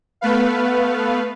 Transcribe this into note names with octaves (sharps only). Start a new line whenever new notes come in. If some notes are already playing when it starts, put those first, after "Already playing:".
A3 B3 B4 F5